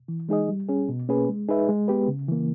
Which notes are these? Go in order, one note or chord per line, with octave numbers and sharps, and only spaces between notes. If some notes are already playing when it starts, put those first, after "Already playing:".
E3
G#3 D#4 G#4 D#5
G3
C#4 G#4
B2
A#3 C#4 G#4 B4
G#3
D#4 G#4 B4 E5
G#3
B3 G4 B4
C#3
E3 A#3